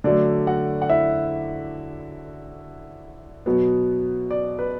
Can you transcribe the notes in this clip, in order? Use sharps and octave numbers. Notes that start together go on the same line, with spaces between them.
D3 F#3 A3 D5
F#4 F#5
F#5
E4 E5
B2 F#3 B3
D5
B4